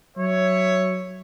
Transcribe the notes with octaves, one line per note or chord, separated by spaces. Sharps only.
F#3 C#5 E5